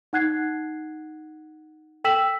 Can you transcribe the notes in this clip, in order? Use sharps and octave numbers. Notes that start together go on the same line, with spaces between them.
D#4 F#5 F#6 G#6 C7
A4 G5 E6 B6 E7 F#7